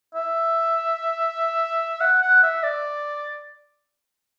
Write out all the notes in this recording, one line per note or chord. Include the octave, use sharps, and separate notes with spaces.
E5
F#5
F#5
E5
D5